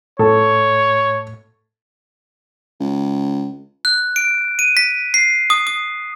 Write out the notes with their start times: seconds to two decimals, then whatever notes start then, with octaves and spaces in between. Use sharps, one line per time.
0.19 A2 A4 C#5
2.80 C#2
3.85 F#6
4.16 D7
4.59 D#7
4.77 B6
5.14 C7
5.50 D#6
5.67 D#6